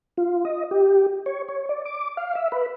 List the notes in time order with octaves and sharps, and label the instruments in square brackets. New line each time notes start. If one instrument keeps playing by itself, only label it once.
[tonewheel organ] F4
D#5
G4
C#5
C#5
D5
D6
F5
E5
B4